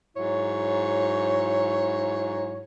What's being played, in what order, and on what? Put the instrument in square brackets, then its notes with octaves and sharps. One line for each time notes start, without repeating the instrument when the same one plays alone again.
[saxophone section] G#2 F#3 E4 C#5